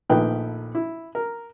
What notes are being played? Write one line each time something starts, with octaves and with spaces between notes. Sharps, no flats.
A#1 D#3 F3 A3 B4 G5
E4
A#4